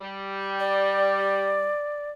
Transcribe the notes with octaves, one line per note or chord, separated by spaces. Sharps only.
G3
D5